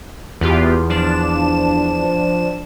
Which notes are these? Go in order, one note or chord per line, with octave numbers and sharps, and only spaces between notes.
E2 B3 F4 G4
F3 D4 E7